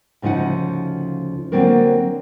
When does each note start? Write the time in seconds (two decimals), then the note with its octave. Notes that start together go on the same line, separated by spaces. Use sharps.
0.22 D2 C#3 F3 D#4 F#5
1.52 D3 F#3 A#3 C4 D4 A#4